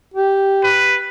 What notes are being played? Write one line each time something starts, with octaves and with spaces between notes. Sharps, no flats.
G4
B4